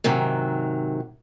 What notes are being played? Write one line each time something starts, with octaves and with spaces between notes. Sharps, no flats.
G#2 C3 D#3 F#3